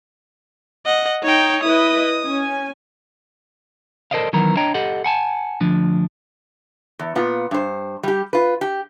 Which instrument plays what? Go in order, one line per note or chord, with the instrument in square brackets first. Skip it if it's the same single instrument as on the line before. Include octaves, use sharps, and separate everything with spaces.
[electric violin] D#5 F#5
[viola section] D#4 [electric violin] C#5 G5
[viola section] E4 B4 D#5 [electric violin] D#6
[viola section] C#4 G#5
[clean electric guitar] A4 A#4 C5 D5 D#5 F5
D#3 E3 F#3 B3 A#4
D4 C#5 D#5 G5 A#5
G4 A4 D#5 F#5
F#5 G#5 A5
D2 F3 D4
[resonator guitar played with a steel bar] E2
A#2 B3 F4
G2 C5
G3 G4
F4 B4
G4